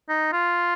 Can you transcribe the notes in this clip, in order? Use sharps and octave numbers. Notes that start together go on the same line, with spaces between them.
D#4
F4